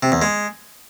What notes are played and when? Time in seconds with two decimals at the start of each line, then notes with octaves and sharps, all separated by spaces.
0.03 C3
0.12 E2
0.22 G#3